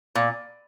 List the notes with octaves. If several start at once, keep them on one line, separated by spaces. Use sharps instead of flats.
A#2